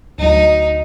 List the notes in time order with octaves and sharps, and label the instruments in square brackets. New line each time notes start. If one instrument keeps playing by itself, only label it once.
[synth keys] D2 F#3 [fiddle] D#4